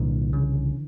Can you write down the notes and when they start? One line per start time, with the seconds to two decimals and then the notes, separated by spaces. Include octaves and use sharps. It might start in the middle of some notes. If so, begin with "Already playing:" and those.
Already playing: C2 A#2 D3 E3
0.33 C#3